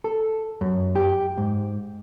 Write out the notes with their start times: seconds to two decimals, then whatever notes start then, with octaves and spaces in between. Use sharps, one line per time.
0.04 A4
0.61 F#2
0.96 G4
1.38 G#2